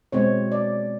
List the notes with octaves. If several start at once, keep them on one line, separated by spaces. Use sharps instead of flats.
B2 G#3 C4 C#5
D5